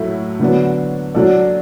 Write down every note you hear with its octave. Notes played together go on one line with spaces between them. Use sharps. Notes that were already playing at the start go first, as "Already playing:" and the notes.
Already playing: A2 F#3 A3 E4
D3 F#3 B3 D4
F#3 D4 A4 D5